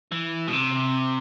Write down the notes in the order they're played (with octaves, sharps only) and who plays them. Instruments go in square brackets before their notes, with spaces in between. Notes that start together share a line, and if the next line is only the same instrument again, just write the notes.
[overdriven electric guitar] E3
B2
C3